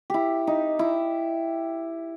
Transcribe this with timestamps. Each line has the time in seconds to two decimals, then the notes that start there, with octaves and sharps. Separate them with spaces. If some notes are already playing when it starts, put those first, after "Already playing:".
0.10 E4 G4
0.47 D#4
0.79 E4